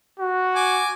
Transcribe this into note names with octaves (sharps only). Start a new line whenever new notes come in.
F#4
G#5 D6